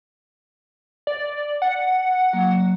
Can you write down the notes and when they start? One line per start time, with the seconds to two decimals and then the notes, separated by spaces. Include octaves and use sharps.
1.07 D5
1.62 F#5
2.33 F#3 A#3